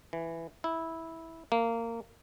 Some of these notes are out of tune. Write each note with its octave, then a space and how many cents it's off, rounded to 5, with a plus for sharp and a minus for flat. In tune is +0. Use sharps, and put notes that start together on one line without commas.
E3 +5
E4 -10
A#3 -20